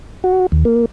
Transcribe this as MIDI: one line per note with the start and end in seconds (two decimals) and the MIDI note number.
0.24 0.46 66
0.52 0.64 39
0.65 0.85 58